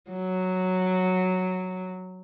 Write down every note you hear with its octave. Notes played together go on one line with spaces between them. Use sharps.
F#3